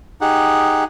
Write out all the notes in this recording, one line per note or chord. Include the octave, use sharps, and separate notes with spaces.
D#4 G4 G#4 F#5